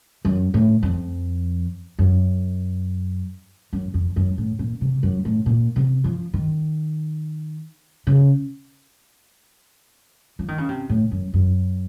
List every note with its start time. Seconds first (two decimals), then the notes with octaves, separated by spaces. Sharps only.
0.25 F#2
0.54 A2
0.83 F2
1.99 F#2
3.73 F#2
3.94 F2
4.16 F#2
4.38 A2
4.59 A#2
4.81 C3
5.03 F#2
5.25 A2
5.46 A#2
5.76 C3
6.04 F3
6.34 D#3
8.07 C#3
10.39 F3
10.48 D#3
10.58 C#3
10.69 C3
10.89 A2
11.11 F#2
11.33 F#2